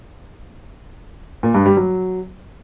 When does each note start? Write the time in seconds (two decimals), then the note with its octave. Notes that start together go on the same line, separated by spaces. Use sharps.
1.43 A#2
1.54 G2
1.66 G3
1.77 F#3